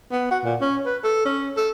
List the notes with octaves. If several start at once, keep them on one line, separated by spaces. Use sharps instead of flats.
B3
F#4
A#2
C#4
B4
A4
C#4
A4